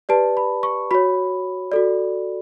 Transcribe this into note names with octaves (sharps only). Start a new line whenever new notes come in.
G4 B4 D5 A5
B5
C#6
F#4 C#5 B5
F#4 A4 D5